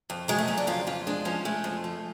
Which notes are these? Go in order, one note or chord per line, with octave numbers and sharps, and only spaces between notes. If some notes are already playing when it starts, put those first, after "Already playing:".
F2
F#3 G#3
A3
C#3 C#4
D4
F2 F4
F2 F4
G#3 D4
F3 C#4
G#3 A3
F2
F3